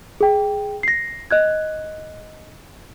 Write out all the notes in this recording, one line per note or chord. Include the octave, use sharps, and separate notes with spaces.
G#4 G5
A#6 C7
D#5 F#6 G#6